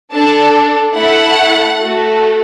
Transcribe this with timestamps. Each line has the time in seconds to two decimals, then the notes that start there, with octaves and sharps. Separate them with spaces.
0.12 D4 A4 A5
0.96 A3 E4 A4 F#5
1.78 A3 F#4 A4